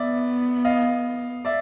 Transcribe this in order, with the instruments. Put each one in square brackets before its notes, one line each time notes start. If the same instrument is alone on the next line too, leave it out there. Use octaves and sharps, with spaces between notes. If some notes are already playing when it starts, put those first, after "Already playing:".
Already playing: [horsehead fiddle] B3 [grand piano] D5 E5
[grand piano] D#5 F5
D5 E5